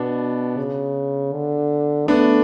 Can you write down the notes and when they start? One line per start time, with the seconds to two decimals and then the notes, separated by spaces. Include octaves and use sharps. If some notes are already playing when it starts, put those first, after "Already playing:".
Already playing: B2 B3 D4
0.57 C#3
1.33 D3
2.08 A3 B3 D4